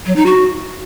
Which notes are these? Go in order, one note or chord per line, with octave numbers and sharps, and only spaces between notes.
F#3
D#4
F#4